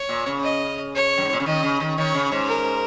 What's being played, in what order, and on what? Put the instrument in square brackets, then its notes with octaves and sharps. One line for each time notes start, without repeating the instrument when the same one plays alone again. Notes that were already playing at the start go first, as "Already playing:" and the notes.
Already playing: [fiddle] C#5
[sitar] A#2
C#3
[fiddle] D#5
C#5
[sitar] F#2
G#2
A#2
C#3
[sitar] D#3 [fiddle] D#5
[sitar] C#3
D#3
[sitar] D#3 [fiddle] C#5
[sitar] C#3
G#2
[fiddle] A#4